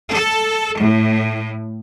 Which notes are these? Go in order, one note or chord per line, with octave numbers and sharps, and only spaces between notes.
A4
A2